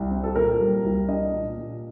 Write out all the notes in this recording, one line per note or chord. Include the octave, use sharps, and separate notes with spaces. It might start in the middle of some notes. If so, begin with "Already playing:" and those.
Already playing: C2
C4
A4
A#2 A#4
G3
C2
D4 D#5
A#2
A#2